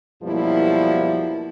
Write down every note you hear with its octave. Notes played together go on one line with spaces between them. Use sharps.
F#2 B2 F3 G3 A#3 E4